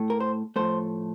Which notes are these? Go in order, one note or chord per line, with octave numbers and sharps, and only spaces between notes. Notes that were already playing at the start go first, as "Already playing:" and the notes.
Already playing: A2 A3
A#4
C5
A2 F3 A3 C5